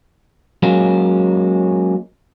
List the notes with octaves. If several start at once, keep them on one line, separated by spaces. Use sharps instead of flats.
F#3 G#3 A#3 C#4